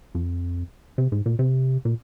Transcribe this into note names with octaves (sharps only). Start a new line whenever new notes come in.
F2
C3
G#2
A#2
C3
A#2